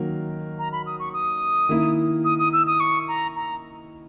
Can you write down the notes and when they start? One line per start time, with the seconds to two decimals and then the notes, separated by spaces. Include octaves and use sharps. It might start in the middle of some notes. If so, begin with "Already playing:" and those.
Already playing: D#3 F#3 A#3 A#4
0.58 A#5
0.72 B5
0.86 D#6
0.99 C#6
1.13 D#6
1.69 D#3 A#3 E4
2.24 D#6
2.38 D#6
2.52 E6
2.66 D#6
2.79 C#6
3.08 A#5
3.35 A#5